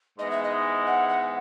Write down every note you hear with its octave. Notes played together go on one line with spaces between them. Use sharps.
G#2 E3 G#3 B3 D#5
E5
D#5
F#5
F#5